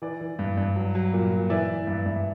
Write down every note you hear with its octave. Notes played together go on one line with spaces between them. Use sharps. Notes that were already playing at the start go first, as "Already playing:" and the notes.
E3 D5
E3
G2
G2
F#3
F#3
A#2
A#2
E3 D5 E5
E3
G2
G2